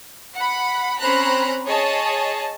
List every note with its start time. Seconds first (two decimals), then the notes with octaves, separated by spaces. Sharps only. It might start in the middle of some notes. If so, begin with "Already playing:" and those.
0.38 F#5 B5
1.00 C4 C#4 C5 A#5 B5 F#6
1.66 G#4 C#5 D#5 A5